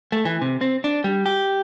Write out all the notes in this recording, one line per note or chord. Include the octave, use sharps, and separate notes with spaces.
A3
E3
C3
C4
D4
G3
G4